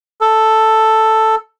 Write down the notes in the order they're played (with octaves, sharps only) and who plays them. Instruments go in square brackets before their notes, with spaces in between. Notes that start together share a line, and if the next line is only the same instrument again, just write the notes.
[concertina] A4